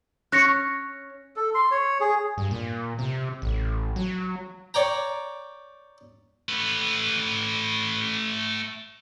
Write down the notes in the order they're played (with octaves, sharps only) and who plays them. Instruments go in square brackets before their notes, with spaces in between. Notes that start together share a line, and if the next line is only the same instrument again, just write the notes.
[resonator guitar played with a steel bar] C#4 C#5 [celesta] F#6 A#6 C#7
[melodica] A4
C6
C#5
G#4
[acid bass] G2
A#2
C3
A1
F#3
[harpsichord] C#5 D5 G5 A#5
[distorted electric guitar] A3 B4